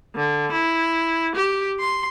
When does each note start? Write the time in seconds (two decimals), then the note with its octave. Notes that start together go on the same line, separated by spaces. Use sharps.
0.15 D3
0.52 E4
1.35 G4
1.79 C6